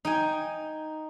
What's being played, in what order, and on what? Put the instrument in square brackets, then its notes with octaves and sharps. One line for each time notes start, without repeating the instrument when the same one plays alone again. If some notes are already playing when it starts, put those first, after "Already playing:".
[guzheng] D#4 G5 G#5